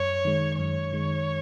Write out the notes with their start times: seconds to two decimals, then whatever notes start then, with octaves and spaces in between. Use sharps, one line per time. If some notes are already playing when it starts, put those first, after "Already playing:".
Already playing: F#2 C#5
0.25 D#3 G#3
0.59 F#2 C#5
0.93 D#3 G#3